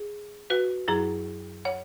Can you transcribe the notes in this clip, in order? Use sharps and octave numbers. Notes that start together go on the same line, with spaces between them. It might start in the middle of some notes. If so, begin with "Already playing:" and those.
Already playing: G#4
F#4 B4
F#2 F#3 E4 G#4
C#5 F#5